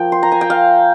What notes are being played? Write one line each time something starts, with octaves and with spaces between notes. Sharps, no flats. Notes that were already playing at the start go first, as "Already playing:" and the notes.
Already playing: F3 A#3 G5
C6
A#5
G#5
G5
F5